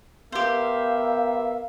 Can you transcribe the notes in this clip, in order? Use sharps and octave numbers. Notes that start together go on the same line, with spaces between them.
B3 G4 A#4 C5 E5 F5